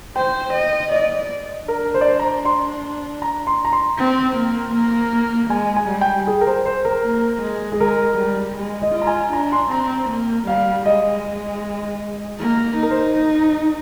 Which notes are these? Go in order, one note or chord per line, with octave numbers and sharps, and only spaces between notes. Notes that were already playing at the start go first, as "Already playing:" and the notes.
C5 G5
D#5
D5 D#5
D4 A#4
C5
D5
C5
A#5
C6
A#5
C6
A#5
C6
C4
A#3
A#3
G#3 G#5
G#5
G3
G5
G#4
A#4
C5
C5
A#4
A#3
G#3
G#4
G#3 A#4
G3
G#3
D#5
F4
A#5
G#5
D4 A#5
C6
C4 A#5
A#3
G3 F5
G#3 D#5
A#3
D#4
A#4
C5